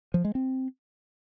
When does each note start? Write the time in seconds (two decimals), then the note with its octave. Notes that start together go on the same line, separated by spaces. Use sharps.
0.14 F3
0.25 G#3
0.35 C4